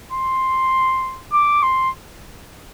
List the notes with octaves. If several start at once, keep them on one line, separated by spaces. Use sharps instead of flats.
C6
D6
C6